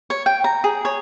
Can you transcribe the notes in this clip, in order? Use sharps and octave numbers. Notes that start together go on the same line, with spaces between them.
C#5
G5
A#5
G#4
C#5